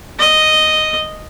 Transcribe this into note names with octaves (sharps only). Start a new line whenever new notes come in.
D#5